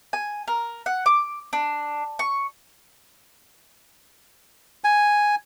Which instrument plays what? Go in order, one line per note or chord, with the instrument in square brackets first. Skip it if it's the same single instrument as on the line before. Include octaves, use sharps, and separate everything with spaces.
[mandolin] G#5
A#4
F#5
D6
D4
C#6
[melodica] G#5